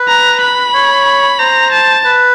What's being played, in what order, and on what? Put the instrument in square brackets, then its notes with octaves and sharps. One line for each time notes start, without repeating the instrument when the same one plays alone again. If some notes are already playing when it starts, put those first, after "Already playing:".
Already playing: [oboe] B4
[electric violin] A#5
B5
[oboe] C#5
[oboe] C5 [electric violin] A#5
[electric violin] A5
[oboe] B4